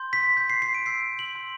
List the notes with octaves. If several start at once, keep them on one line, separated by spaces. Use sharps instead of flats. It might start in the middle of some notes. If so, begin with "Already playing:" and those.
Already playing: C6 G6
B6
C6 G6 B6
C7
C7
D7
C6 E6 G6 C7
F#7
C6 E6 G6